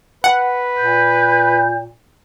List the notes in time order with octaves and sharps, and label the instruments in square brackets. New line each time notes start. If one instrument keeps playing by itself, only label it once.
[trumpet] B4 [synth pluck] F#5
[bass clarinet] A#2 [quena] G6